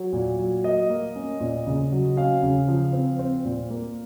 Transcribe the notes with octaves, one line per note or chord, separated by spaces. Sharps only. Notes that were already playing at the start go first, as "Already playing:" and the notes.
Already playing: F#3 C#5
A#2
F#3
A#3 D#5
A#3
C#4
A#2
C#3
F#3
C#4 F5
C#3
F3
C4
C4
A#2
A#3